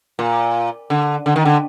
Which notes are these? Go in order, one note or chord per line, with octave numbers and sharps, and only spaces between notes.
A#2
D3
D3
D#3
D3